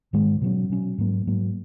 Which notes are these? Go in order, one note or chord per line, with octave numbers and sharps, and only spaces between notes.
G#2 D#3 G#3
B2 F#3 C#4
B2 F#3 C#4
G#2 F#3 A#3
G#2 F#3 A#3